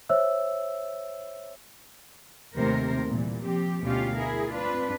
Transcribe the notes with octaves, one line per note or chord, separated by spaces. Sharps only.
C5 C#5 E5 E6
D#2 C3 A3 A#4 C5
A#2 E3 G3
F3 C4 G4
D2 B2 C#4 F4 G4 F5
E4 G#4 A#4
C4 D4 F4 B4